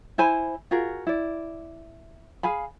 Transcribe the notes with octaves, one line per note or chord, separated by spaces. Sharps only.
E4 C5 G#5 B5
F4 F#4 G#4 A#4
E4 D5
G#4 F5 G#5 B5